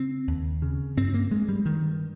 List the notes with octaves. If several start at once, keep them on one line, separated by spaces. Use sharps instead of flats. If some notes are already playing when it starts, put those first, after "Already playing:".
Already playing: C#3 C4
D#2
C#3
G2 C4
A#3
G2 G#3
G3
G2 D#3